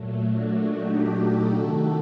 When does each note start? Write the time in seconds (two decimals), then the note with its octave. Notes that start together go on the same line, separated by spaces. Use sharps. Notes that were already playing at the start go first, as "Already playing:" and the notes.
Already playing: A#2 F#3 A3
0.22 D4 F#4
0.65 D#4 G4
1.07 F#4 A4
1.51 C3 D#3 A3